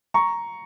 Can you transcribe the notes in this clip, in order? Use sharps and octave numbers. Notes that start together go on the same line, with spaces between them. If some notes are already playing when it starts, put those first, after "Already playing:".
A#5 C#6